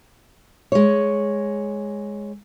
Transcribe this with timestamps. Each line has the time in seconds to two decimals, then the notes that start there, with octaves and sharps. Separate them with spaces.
0.72 G#3 C#5